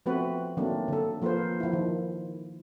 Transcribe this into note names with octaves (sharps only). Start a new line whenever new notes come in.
F3 A3 B3 C4 F#4 B4
D#3 F#3 A3 A#3 C4 D4
D3 A4
F3 A#3 F4 A4 B4 C5
F3 E4
D#3